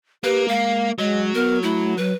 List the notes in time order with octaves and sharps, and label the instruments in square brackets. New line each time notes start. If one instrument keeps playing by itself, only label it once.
[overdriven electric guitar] A#3 [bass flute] G4 [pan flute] B4
[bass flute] G#3 [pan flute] F5
[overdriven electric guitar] F#3 [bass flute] G#3 [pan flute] D#5
[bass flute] B3 [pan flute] A#4
[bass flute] A3 [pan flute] E4
[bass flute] F#3 [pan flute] B4